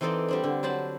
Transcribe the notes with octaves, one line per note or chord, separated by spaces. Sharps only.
E3 C4 D#4 A4 C5 D5
G3 C4 D4
D3
F#3 D4 C5 A5 B5